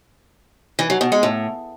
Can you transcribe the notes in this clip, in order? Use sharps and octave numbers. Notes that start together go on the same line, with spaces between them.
E3
F#3
B2
G#3
A2